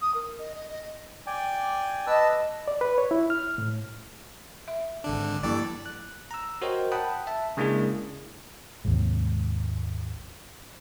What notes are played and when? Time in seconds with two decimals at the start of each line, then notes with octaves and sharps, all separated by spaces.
0.01 D#6
0.15 A#4
0.38 D#5
0.55 D#5
0.69 D#5
1.27 D5 G5 G#5
2.07 B4 D#5 A5 E6
2.68 D5
2.81 B4
2.98 C#5
3.11 E4
3.30 F6
3.58 A2
4.68 E5
5.04 G#1 D3 D4
5.43 G2 F3 A#3 E4 A4 D5
5.86 F#6
6.31 A#5 E6
6.62 F#4 A#4 C5 C#5 D#5 G5
6.92 F#5 G5 A5 B5 D#6 F#6
7.27 E5 A5
7.57 C#3 G#3 A#3 D4 E4 G#4
8.85 G#1 D#2